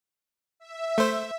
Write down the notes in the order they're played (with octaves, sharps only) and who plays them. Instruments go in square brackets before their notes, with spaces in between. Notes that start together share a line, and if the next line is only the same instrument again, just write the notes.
[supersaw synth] E5
[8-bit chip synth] A3 C5